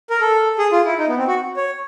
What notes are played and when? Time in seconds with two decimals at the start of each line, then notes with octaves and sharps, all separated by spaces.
0.10 A#4
0.21 A4
0.59 G#4
0.72 F4
0.85 E4
0.99 D#4
1.08 B3
1.17 C4
1.28 F#4
1.57 C#5